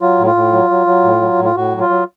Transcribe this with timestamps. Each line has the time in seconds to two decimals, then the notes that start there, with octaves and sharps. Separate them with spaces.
0.01 F#3 F4
0.19 A2
0.27 F4
0.35 A2
0.53 F#3
0.70 F#3
0.87 F#3
1.04 A2
1.21 F#3
1.39 A2
1.45 F4
1.56 A2 F#4
1.73 F#3
1.81 F4
1.90 F#3